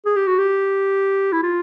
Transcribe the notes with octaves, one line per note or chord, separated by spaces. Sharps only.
G#4
G4
F#4
G4
E4
F4